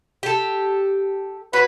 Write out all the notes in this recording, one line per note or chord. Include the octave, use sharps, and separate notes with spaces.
G4 A4
C#4 F#4 B4